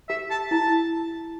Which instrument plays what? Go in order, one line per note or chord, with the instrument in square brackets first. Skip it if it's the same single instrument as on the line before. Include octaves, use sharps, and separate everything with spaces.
[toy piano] G4 [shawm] E5
[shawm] A5
[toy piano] E4 [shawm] A5